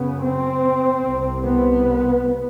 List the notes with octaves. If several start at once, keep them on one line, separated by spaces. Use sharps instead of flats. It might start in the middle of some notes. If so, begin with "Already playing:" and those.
Already playing: F#2 C#3 B3
C4
C2 C3
B3